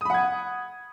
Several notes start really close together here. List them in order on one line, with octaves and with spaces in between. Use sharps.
D#6 B5 F#5 G#6